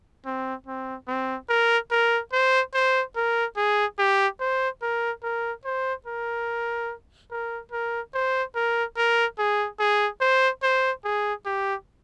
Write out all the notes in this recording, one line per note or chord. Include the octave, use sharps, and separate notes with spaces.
C4
C4
C4
A#4
A#4
C5
C5
A#4
G#4
G4
C5
A#4
A#4
C5
A#4
A#4
A#4
C5
A#4
A#4
G#4
G#4
C5
C5
G#4
G4